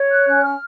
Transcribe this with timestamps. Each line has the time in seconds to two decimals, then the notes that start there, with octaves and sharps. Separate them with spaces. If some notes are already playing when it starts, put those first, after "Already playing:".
Already playing: C#5
0.10 F#6
0.26 C#4 F#6
0.43 F6